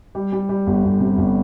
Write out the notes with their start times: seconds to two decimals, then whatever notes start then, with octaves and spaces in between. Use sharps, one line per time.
0.15 G3
0.32 G3
0.49 G3
0.67 G1
0.84 G1
1.00 C3
1.17 G1